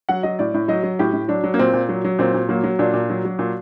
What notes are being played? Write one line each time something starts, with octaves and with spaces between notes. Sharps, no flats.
F#3 F#5
F#3 D#5
A2 D5
A2
F#3 D#5
F#3
A2 G4
A2
F#3 D4
F#3
A#3
A#2 C4
A#2
F#3
F#3
A#2 C4
A#2
F#3 A#3
F#3
A#2 D4
A#2
F#3
F#3
A#2